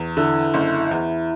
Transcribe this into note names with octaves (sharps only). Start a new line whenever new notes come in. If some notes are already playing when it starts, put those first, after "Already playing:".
Already playing: E2
D3 E4
F#1
E2